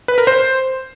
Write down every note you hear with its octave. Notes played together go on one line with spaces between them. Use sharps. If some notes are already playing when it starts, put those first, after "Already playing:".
B4
A#4
C5